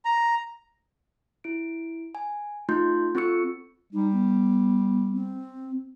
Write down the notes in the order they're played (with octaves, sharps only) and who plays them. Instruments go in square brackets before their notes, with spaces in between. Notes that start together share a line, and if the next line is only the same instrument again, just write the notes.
[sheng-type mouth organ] A#5
[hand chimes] E4 D7
G#5
A3 D#4 F4 C6 G6
C4 F4 A4 C#6 E6 C#7
[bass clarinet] G3 [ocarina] D#4
[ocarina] B3
C4